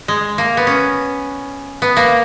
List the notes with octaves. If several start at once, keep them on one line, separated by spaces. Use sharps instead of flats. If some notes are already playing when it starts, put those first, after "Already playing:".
G#3
A#3
B3
C#4
B3
A#3